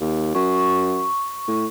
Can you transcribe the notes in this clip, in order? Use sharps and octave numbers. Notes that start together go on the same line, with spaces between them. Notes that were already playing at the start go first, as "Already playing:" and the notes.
D#2
F#2 C#6
A2